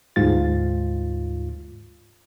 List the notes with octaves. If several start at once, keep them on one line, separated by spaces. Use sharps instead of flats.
D2 G#2 F4 A6